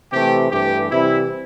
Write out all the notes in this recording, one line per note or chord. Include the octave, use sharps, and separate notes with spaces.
C3 E3 A3 G4
G2 E3 A3 G4
C3 E3 G3 E4